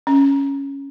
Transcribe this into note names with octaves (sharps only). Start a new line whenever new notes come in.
C#4